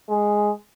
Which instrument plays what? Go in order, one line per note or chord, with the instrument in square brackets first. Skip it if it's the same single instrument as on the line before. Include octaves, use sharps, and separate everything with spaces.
[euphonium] G#3